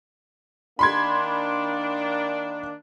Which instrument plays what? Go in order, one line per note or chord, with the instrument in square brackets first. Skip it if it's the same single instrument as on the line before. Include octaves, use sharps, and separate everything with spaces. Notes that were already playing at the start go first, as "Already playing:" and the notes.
[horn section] D#3 A#3 D4 [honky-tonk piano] B5 C6 G#6